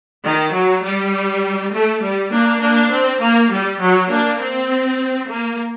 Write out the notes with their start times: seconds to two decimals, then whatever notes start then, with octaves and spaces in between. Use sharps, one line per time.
0.23 D#3
0.53 F#3
0.83 G3
1.72 A3
2.02 G3
2.31 A#3 D4
2.61 A#3 D4
2.91 C4
3.20 A#3
3.51 G3
3.80 F#3
4.10 A#3 D4
4.39 C4
5.29 A#3